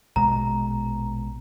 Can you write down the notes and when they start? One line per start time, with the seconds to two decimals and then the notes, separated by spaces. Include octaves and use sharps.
0.16 A#1 B2 G#3 A#5